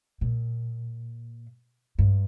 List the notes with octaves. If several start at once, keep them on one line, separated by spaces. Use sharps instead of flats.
A#2
G2